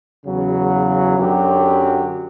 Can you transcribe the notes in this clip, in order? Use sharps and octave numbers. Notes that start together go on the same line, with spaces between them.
E2 C#3 F#3
F#2 D3 F#3 G4